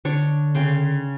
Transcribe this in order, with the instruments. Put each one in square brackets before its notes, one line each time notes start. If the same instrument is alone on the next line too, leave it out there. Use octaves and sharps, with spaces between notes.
[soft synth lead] D3 [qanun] D4 C#5
[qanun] C#3 G5 C6